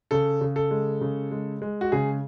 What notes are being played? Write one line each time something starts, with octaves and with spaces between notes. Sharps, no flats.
C#3 A4
C#3
A4
G#3
C#3
G#3
G#3
F#4
C#3 G#4